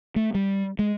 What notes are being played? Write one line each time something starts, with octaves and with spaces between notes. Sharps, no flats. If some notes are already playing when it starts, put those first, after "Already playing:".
A3
G3
G#3